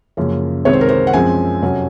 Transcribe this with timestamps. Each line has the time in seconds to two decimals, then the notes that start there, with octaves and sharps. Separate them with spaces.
0.17 F#2 C#3 F3 A#3 C#4
0.65 C2 C3 D#3 G#3 C4 C#5
0.73 C5
0.81 A#4
0.89 C5
1.07 F#5
1.13 F#2 F3 G#3 C4 G#5
1.62 F2 C3 F#3 C#4